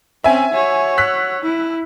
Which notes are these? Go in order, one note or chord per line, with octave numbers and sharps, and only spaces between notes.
C4 C#4 E5 G#5
F#4 C#5
E6 F#6 B6
E4